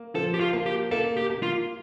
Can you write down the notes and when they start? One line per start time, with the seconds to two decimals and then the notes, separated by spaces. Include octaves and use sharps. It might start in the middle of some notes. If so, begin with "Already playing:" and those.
Already playing: A#3
0.15 F3 A4
0.34 G4
0.40 F4
0.53 A#3
0.66 G4
0.91 A#3 A4
1.17 G4
1.30 A#3
1.42 F4